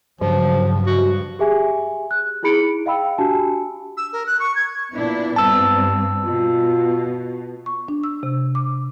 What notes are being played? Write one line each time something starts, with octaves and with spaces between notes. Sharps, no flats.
G2 C#3 F3 F#3
F#4
G4 G#4 E5 G#5
F#6
D#4 E4 G#4 B5 C#7 D7
D#5 F5 G5 B5 E6
D4 F#4 G4 G#5 A5
E6
A#4
F#6
C#6
G#6
A#2 B3 D4 E4
G2 C4 A5 E6
B2 F4
C#6
D4
E6
C3
D6